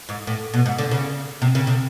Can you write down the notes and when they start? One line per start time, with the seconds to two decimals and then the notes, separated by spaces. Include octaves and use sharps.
0.09 G#2
0.27 A2
0.54 B2
0.66 G#2
0.78 D3
0.91 C#3
1.42 C3
1.55 C#3
1.67 C3